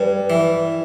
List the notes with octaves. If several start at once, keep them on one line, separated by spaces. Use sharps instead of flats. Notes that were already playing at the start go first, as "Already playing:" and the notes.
Already playing: G2 B4
E3